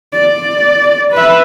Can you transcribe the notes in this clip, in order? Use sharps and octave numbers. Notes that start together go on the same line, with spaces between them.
D5
B4 E5